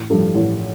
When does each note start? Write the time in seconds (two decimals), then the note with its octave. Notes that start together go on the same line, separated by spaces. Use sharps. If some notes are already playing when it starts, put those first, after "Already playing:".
Already playing: A1
0.10 G2 F3 A3
0.35 A1